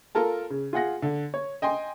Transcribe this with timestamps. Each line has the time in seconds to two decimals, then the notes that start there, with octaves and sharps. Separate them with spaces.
0.15 F4 A4 A#4 A5
0.50 C#3
0.73 F4 G#4 F#5 A#6
1.02 D3
1.34 C#5
1.62 D#5 G5 G#5 C6